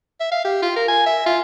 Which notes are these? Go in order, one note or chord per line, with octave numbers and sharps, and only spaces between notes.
E5
F5
G4
F4
A#4
G#5
E5
F4